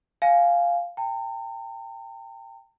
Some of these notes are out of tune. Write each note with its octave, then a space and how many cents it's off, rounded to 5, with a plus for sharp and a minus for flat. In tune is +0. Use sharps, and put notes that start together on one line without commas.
F5 +0 G#5 +15
G5 +15 A#5 -45